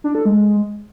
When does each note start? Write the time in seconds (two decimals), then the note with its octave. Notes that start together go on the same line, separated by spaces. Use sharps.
0.04 D4
0.15 A4
0.25 G#3